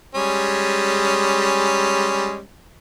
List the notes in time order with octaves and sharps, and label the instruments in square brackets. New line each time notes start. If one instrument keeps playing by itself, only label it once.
[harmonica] G3 G#3 C#4